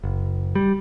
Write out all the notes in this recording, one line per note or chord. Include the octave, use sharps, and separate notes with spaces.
F#1
G3